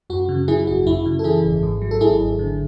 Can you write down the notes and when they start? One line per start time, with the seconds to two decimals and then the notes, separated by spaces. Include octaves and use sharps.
0.10 F#2 F#4
0.29 C#3
0.48 F#3 E4 G#4
0.67 G#1 F#4
0.87 F#2 E4
1.06 C#3
1.19 A4
1.24 E3 E4 G#4
1.44 G#1
1.63 G#2
1.82 F#3
1.91 A4
2.01 G#1 E4 G#4
2.20 G#1
2.39 D3